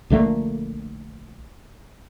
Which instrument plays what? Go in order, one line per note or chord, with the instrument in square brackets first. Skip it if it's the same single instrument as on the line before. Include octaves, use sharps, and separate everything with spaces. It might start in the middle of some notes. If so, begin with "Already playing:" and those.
[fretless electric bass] A#1 D3 A3 A#3